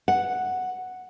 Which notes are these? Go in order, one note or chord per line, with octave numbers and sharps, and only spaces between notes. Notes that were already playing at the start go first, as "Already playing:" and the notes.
F#5